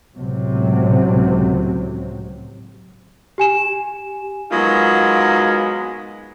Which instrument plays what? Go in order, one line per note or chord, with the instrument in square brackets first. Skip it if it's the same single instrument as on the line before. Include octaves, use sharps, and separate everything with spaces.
[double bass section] C#2 A2 C3 F#3
[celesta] G4 G#5 E7
[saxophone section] F#3 G#3 A#3 B3 D#4 F4